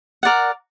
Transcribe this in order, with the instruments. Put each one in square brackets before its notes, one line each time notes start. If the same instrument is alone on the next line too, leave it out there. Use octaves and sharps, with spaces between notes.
[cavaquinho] A#4 D5 F#5